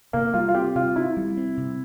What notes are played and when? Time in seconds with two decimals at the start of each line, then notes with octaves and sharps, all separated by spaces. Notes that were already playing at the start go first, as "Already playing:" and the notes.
0.13 C3 A#3
0.34 G3 F4
0.49 F4
0.55 C4 G4
0.75 C3 F4
0.96 C3 E4
1.17 G3
1.37 C4
1.57 C3